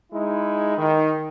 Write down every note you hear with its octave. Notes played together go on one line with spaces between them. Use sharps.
G#3 D#4 E4
D#3